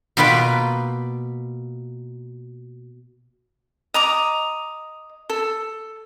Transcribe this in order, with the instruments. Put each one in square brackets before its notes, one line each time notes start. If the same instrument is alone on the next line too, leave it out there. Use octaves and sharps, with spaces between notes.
[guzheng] B2 A#3 F4 B4 G5 B5
[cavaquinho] D#5 A#5 D6
A4